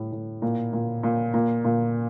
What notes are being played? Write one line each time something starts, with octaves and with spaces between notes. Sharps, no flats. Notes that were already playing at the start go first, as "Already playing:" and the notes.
Already playing: A2 G3
A2
A#2
A#2
A#2
A#2
A#2